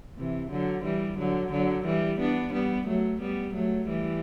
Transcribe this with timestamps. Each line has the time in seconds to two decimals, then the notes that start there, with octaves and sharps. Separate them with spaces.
0.18 C3 E3
0.51 D3 F#3
0.84 E3 G3
1.18 D3 F#3
1.52 D3 F#3
1.85 E3 G3
2.20 B3 D4
2.53 G3 B3
2.87 F#3 A3
3.21 G3 B3
3.54 F#3 A3
3.88 E3 G3